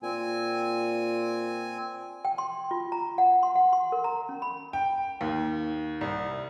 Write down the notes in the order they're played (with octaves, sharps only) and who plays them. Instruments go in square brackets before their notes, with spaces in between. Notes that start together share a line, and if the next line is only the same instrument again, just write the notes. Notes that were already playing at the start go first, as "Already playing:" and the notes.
[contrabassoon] A#2 [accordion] C4 G#5
[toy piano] G5
C6
F4
A#5
F#5
C6
F#5
C6
A#4
A#5
C#4
B5
[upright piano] G5
D#2
C2